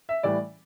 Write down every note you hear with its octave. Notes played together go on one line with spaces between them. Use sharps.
E5
A2 E3 G3 D5